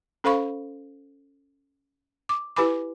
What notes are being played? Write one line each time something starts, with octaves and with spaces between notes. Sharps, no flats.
C#4 A4 C5 F5 B5 C#6
D6
E4 G4 B4 G#5 B5 D6